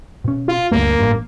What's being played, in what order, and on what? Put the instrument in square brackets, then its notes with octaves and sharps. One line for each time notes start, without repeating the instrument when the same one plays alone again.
[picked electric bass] B2 C#4
[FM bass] F4
[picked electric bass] D2 G2 [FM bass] A#3
[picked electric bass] A1 G2